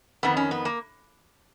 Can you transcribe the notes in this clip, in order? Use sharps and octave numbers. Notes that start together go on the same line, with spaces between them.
F2 D#3 B3
C#4
B3
A#3